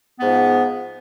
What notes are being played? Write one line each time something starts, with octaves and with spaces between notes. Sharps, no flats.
G#2 F3 B3